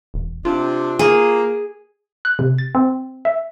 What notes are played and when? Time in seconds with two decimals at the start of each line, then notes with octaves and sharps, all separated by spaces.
0.14 E1
0.45 C3 D4 F4
0.99 A#3 G#4
2.25 F#6
2.39 C3
2.58 A6
2.75 C4
3.25 E5